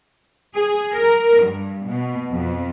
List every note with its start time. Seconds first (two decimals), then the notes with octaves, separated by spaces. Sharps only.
0.55 G#4
0.94 A#4
1.42 G2
1.87 B2
2.31 F2